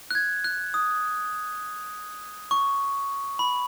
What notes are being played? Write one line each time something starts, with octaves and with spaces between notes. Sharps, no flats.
F#6
G#6
F#6
D#6
C#6
B5